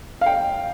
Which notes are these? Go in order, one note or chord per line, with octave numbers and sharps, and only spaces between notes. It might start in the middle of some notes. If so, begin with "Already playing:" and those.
F5
G5